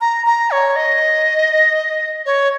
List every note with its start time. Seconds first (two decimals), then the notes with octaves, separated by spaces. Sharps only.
0.01 A#5
0.26 A#5
0.51 C#5
0.76 D#5
2.26 C#5